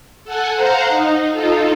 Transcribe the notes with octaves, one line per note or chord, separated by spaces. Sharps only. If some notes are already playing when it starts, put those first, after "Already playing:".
A4 F#5 G#5
C5 F5 F#5 A#5
D#4
D#4 F4 A4